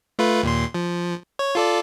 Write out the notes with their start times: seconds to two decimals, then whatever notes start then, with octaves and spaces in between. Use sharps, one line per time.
0.19 A3 F4 B4
0.43 D#2 A#2 C6
0.74 F3
1.39 C#5
1.55 F4 A4 D5